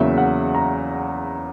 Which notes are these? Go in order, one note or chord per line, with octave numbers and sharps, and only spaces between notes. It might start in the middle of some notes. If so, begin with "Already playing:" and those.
Already playing: E2 C#3 F#3 A#3 E4 E5
F#5
A#5